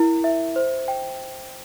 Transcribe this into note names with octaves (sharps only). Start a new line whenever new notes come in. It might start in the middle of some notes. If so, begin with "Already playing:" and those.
Already playing: E4 A#4
E5
C5
G5